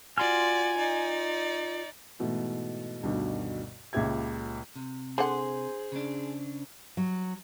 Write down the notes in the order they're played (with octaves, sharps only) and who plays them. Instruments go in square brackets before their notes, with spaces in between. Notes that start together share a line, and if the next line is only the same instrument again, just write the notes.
[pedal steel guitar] F4 C6 F6 [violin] F#4 D5 [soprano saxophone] G#5
[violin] D#4 D5
[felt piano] G#2 B2 E3 A3
D2 G2 B2 D#3
C#2 A#2 C#3 G4 E5 G#6
[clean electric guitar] C3
[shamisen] D3 F#5 [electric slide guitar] G#4 [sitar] C5
[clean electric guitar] C#3 D4
[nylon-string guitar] F#3